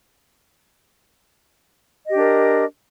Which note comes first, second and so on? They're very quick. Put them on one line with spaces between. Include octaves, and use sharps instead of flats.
D#5 G4 D4 A#4